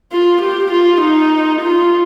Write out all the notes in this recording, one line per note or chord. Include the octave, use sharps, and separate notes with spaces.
F4
G4
F4
D#4
F4